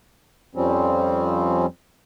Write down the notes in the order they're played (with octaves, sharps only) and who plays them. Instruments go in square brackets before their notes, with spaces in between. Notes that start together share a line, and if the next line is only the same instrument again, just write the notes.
[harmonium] F2 F3 G3 C4 C#4